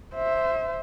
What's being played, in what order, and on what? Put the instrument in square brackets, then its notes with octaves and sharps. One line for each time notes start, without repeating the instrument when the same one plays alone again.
[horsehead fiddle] C5 E5